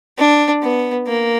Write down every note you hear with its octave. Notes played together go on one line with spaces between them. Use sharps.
D4
B3
A#3